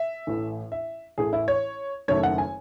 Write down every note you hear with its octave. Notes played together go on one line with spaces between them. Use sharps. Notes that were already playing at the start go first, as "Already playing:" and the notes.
Already playing: E5
A1 A2 E3
E5
A1 A2 E3 A3 G#4
E4
C#5
F#1 F#2 D#3 A3 C#5
F#5
G#5